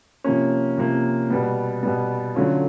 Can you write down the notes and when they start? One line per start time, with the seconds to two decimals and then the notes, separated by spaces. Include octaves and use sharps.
0.24 C3 F3 A#3 C#4
0.77 C3 F3 A#3 C#4
1.30 B2 G3 B3
1.83 B2 G3 B3
2.35 D3 F#3 A3 C#4 F4